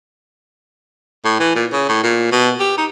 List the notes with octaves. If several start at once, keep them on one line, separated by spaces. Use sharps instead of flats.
A2
E3
A#2
C#3
A2
A#2
B2
G4
D#4